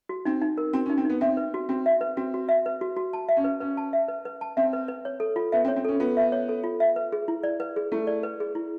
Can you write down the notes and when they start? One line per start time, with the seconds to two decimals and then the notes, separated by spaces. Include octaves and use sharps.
0.09 F#4
0.25 C4 D#4
0.41 D#4
0.58 A#4
0.73 C4 F#4
0.86 C#4
0.90 D#4
0.98 C4
1.05 B3 D#4
1.21 C4 E5
1.37 B4
1.54 F#4
1.69 C4 F#4
1.86 E5
2.01 B4
2.17 C4 F#4
2.34 F#4
2.49 E5
2.66 B4
2.81 F#4
2.96 F#4
3.13 A5
3.29 E5
3.37 C#4
3.44 B4
3.60 C#4 B4
3.77 A5
3.93 E5
4.08 B4
4.25 B4
4.41 A5
4.57 C4 E5
4.73 B4
4.88 B4
5.05 C#5
5.20 A4
5.36 F4
5.52 B3 E5
5.65 C4
5.68 C#5
5.76 C4
5.85 C#4 A4
6.00 B3 F4
6.17 E5
6.32 C#5
6.49 A4
6.64 F4
6.80 E5
6.96 B4
7.12 G#4
7.28 E4
7.43 D5
7.60 B4
7.76 G#4
7.92 A3 E4
8.07 D5
8.23 B4
8.40 G#4
8.55 E4